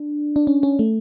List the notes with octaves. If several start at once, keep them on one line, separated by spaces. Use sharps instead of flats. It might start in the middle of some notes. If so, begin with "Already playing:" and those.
Already playing: D4
D4
C#4
C#4
A3